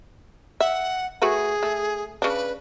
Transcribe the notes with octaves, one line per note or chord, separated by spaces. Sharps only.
E5 F#5
A3 F#4 G#4 B4
A3
C#3 D4 B4